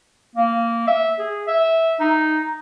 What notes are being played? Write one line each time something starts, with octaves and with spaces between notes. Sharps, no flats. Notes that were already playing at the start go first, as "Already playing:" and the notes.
A#3
E5
G#4
E5
D#4